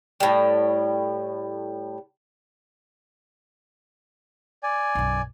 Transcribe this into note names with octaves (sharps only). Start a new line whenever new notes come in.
A2 G3
D5 G#5
B1 F#2